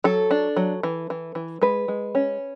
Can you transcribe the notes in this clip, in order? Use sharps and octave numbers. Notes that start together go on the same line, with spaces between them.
F#3 A4
D4
F#3
E3
E3
E3
G#3 B4
G#3
C#4